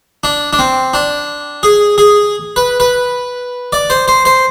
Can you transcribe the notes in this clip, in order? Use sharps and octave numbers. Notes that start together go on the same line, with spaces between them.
D4
D4
C4
D4
G#4
G#4
B4
B4
D5
C5
C5
C5